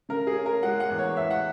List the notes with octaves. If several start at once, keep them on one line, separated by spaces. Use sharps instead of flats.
C#3 A#4
G#4
C#4
A#4
G#3 F#5
F#5
E2
C#5
E2 E5
F#5